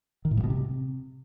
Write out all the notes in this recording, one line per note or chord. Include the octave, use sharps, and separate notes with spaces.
D#3
A2
G2
B2
C3